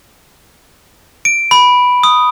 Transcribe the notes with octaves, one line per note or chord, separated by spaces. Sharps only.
D7
B5
D#6